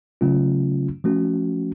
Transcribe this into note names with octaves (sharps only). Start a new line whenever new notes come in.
C#3 F#3 A3 C#4 F4
F3 A3 C#4 F#4